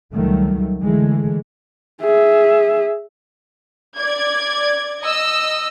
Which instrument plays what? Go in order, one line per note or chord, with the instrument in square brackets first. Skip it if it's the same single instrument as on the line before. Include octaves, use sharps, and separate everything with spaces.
[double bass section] C#2 D#3 F#3 G3 A3
D3 E3 G#3 A3
[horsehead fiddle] G#4 E5
[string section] D5 G#6
[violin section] D#5 E6